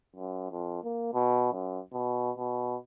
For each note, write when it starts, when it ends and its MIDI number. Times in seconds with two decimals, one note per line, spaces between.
0.16 0.48 42
0.51 0.80 41
0.84 1.09 58
1.14 1.51 47
1.53 1.79 42
1.93 2.31 47
2.38 2.76 47